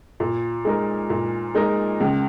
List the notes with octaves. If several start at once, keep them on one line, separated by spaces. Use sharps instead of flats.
A#2
G#3 D#4 A#4
A#2
G#3 D#4 A#4
C#2